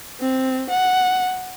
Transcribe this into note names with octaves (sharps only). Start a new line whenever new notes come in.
C4
F#5